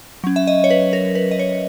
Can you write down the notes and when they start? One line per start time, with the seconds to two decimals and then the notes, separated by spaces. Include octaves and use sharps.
0.24 F#3 C#4
0.36 E5
0.47 D#5
0.64 C#5
0.70 B4
0.93 A#4
1.15 B4
1.31 D#5
1.39 C#5